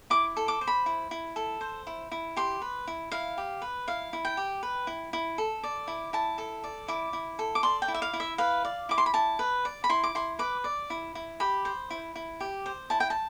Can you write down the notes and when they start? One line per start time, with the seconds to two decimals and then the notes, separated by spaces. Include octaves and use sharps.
0.10 E4 D6
0.37 A4
0.48 D6
0.61 C5
0.67 B5
0.86 E4
1.11 E4
1.36 A4
1.61 C5
1.87 E4
2.12 E4
2.37 G4 C6
2.62 B4
2.87 E4
3.12 E4 F5
3.38 G4
3.62 B4
3.87 E4 F5
4.13 E4
4.25 G5
4.37 G4
4.63 B4
4.87 E4
5.13 E4
5.38 A4
5.63 D5
5.88 E4
6.13 E4 A5
6.38 A4
6.64 D5
6.88 E4 D6
7.13 E4
7.39 A4
7.55 D6
7.63 D5 C6
7.82 G5
7.88 E4
7.94 E5
8.02 F5
8.13 E4
8.20 E5
8.38 B4 F5
8.65 D5
8.89 E4 D6
8.98 C6
9.06 B5
9.14 E4 A5
9.39 B4
9.65 D5
9.84 B5
9.89 E4 C6
10.03 D6
10.15 E4 C6
10.39 B4 D6
10.64 D5
10.90 E4
11.15 E4
11.40 G4 B5
11.65 C5
11.90 E4
12.15 E4
12.40 G4
12.66 C5
12.90 E4 A5
13.00 G5
13.10 A5